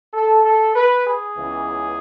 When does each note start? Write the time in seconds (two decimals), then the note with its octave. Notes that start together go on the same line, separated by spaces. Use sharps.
0.13 A4
0.44 A4
0.75 B4
1.06 G#4
1.35 C#2 C#3 E3 B3